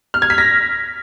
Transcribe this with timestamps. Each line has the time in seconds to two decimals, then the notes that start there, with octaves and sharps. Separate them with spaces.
0.14 F6
0.22 G#6
0.30 B6
0.38 A#6